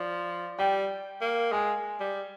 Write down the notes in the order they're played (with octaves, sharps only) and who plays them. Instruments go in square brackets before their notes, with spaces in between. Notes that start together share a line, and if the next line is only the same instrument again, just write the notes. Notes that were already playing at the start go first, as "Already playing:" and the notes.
Already playing: [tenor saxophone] F3 [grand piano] D5
[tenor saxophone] G3 [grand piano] G5
[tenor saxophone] A#3
[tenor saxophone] G#3 [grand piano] G#5
[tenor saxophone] G3